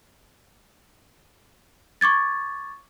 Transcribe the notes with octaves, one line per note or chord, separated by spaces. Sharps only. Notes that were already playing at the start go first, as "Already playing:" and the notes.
C#6 D6 G#6 A6